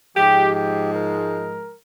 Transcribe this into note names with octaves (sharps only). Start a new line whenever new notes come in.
G#2 F3 G#3 G4
G4
A#4